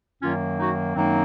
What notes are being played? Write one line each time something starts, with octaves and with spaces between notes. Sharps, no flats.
F#2 D#3 F#3 A#3 C#4 F4
D#4 F#4
F#2 D#3 F#3 A#3 C4 D#4